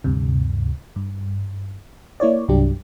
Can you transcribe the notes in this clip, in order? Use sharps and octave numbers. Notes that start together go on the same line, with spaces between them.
D2 G2 C3
G2
A#3 E4 C#5 D5
C2 G2 F#3 D4 G4